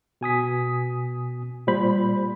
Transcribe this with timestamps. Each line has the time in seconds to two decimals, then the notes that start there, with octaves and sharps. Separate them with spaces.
0.21 B2 G#5 D#6 B6
1.67 A#2 G3 C5 B5